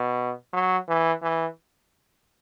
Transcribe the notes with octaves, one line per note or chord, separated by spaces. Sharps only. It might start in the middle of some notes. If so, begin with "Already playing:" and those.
Already playing: B2
F#3
E3
E3